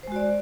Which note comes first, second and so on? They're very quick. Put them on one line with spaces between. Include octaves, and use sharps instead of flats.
C5 G#3 F#4 D5